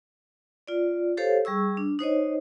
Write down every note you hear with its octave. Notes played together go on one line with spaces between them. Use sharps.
F4 D5
G4 A4 C5 C#5 F5
G3 G#4 C#6 E6
D4
D#4 C5 C#5 D#5